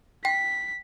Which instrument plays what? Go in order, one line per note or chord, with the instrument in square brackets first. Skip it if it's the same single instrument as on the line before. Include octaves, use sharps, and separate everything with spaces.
[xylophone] G5 [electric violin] B6